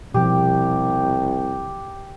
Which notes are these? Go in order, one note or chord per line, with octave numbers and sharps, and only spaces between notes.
C2 B2 F3 G4